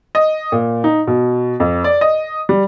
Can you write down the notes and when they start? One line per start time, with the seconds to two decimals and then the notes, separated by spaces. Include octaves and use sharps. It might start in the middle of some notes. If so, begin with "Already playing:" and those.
0.15 D#5
0.52 A#2
0.84 D#4
1.07 B2
1.60 F2
1.84 D5
2.01 D#5
2.49 G3